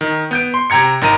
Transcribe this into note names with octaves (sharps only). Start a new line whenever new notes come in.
D#3
B3 G6 D7
C6
C3 G5 A#5 G#6 C#7
G#1 D#3 A#5 D#7